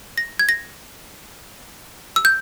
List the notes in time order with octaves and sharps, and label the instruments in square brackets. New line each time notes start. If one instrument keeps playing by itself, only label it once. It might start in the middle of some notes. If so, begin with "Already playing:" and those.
[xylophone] A#6
G#6
A#6
E6
G6